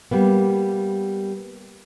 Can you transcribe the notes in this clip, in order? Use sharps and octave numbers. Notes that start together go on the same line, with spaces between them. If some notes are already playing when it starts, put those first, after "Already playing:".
G3 A#3 B3